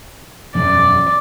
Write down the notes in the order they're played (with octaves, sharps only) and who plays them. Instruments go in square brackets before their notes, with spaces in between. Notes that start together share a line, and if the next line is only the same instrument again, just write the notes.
[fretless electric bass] E1 F#2 [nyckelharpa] D5